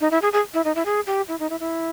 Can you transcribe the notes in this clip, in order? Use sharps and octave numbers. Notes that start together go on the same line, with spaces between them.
D#4
E4
G#4
G#4
E4
D#4
E4
G#4
G4
E4
D#4
E4
E4